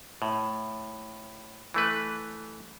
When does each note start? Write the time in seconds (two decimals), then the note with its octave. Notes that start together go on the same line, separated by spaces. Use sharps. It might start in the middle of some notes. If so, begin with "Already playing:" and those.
0.22 A2
1.74 E3 A3 B4